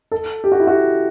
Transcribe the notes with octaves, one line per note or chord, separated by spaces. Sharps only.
A4
G4
F#4
E4
F#4